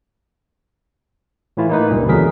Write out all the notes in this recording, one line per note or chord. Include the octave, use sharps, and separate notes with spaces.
A2 E3 E4 F4
A#3 D#4 B4
C#2 G2 A#2
E2 D3 F#3 G#4 A#4 B6